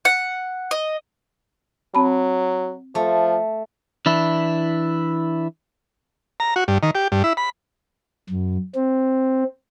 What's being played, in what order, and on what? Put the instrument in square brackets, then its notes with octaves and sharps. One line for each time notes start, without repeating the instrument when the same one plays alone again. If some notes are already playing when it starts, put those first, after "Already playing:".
[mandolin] F#5
D#5
[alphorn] F#3 [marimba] C4 A5 B5
[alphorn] F3 [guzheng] A3
[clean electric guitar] E3 D4 E4
[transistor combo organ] A#5
F#4
G2
D#3
G4
G2
E4
B5
[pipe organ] F#2
C4